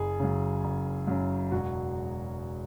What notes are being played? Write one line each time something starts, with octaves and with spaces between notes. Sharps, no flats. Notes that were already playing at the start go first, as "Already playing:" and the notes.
Already playing: F#1 G#4
F#2 C#3
F#1
F#2 C#3
E1 F#4